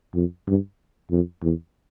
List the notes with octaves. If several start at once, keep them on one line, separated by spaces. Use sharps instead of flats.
F2
G2
F2
E2